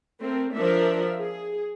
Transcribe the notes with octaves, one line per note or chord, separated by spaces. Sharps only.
A3 C4 A#4
F3 D4 A#4 E5
G#4